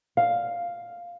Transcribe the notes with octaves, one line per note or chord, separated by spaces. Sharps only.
F5